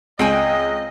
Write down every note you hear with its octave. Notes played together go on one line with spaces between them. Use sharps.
C#2 C4 D#5 G5 G#5